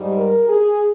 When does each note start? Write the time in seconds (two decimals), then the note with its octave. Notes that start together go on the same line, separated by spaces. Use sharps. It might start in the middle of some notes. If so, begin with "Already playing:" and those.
Already playing: G#2 G3
0.16 A#4
0.49 G#4